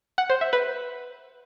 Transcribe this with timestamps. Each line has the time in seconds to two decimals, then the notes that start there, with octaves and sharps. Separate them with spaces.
0.18 F#5
0.30 C5
0.41 E5
0.53 B4